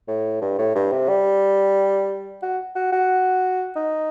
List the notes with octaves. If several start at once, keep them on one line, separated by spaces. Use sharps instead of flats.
A2
G2
A2
G2
C3
G3
F#4
F#4
F#4
D#4